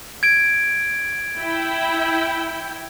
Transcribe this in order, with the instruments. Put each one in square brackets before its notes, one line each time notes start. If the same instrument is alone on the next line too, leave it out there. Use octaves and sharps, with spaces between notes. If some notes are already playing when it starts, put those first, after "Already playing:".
[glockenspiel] G#6 D7
[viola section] E4 G5